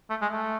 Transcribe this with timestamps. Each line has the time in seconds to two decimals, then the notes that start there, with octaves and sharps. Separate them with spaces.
0.10 A3
0.22 G#3
0.33 A3